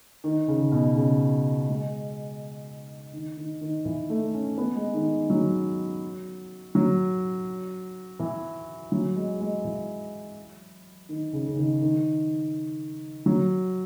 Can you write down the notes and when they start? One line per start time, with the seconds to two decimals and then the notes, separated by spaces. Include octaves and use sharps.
0.24 D#3
0.48 C#3
0.72 B2
0.96 C#3
1.68 G#3
3.13 D#3
3.37 D#3
3.61 D#3
3.85 E3
4.10 A3
4.34 C#4
4.58 B3
4.76 G#3
4.94 D#3
5.30 F#3
6.75 F#3
8.19 E3
8.92 F#3
9.16 G#3
9.40 G#3
9.64 E3
11.09 D#3
11.33 C#3
11.46 C#3
11.57 D#3
11.82 D#3
13.26 F#3